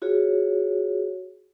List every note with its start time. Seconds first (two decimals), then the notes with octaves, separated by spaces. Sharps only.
0.02 F4 F#4 G#4 C#5